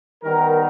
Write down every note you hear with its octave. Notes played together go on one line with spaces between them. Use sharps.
D#3 G3 B3 A#4